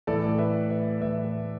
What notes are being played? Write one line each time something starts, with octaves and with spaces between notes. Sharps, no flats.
A2 E3 A4 D5
B4 E5
B4 E5
A2 E3 B4 E5
B4